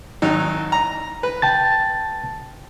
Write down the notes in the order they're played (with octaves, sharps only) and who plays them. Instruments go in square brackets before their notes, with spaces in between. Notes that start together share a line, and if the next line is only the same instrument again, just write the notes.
[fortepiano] G#1 F#3 D#4
A#5
B4
[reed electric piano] G5 A5 A6